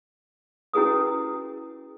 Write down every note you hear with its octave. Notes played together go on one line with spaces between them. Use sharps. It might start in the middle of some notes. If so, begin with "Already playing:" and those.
C#4 E4 F#4 G#4 B4 D#6